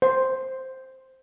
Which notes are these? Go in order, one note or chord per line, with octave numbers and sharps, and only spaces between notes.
C5